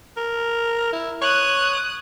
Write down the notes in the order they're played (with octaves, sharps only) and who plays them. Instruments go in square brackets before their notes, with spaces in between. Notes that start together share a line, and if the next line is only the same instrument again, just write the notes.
[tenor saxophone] A#4
E4
[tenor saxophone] C#5 [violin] D#6 F#6